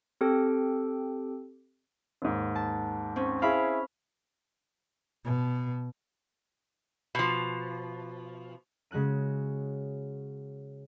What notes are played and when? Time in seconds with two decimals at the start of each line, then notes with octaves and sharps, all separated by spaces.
0.21 C4 G4 A4 G5
2.22 D#2 G#2
2.55 A5
3.16 C4 C#4
3.42 E4 G#4 F5 B5
5.25 B2
7.15 B2 F3
8.91 C#3 G#3 F#4 F#6 D#7